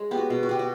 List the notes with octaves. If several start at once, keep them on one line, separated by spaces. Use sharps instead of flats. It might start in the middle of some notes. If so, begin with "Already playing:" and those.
Already playing: G#3
B3 G4
F#4
B2
F#4
B2 G4
F#4